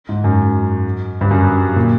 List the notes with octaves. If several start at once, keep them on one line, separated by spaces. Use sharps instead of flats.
G#2
F#2
G2
F#2
A#2